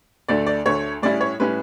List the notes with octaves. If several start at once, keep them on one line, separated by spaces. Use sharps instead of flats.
D2 D3 A3 D5
D5
D2 D3 A3 C#5
A2 G3 C#4 E4 D5
C#5
A2 G3 C#4 E4 B4